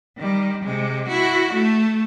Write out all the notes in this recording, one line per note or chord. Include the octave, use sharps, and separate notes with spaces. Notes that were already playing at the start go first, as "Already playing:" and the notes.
D#3 G3
C3 G#3
E4 F#4
A3